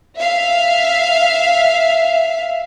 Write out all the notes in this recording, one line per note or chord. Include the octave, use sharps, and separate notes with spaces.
E5 F5